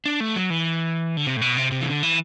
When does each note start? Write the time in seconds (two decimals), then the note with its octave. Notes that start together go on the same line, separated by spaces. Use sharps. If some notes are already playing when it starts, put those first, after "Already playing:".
0.06 D4
0.20 A3
0.36 F#3
0.50 E3
1.17 D3
1.27 C3
1.37 A2
1.41 B2
1.57 C3
1.72 C3
1.81 E3
1.87 D3
2.03 E3